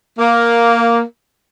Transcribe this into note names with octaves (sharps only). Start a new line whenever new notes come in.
A#3